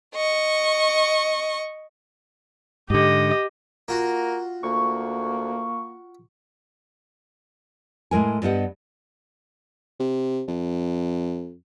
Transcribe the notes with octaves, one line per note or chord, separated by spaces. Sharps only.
D#5 C#6
G#2 D3 G4 D#5
A#3 F4 F#4
D2 A#3 C#6
A2 G#3 A#4 G#5
G2 G3 B3 D#5 F#5
C3
F2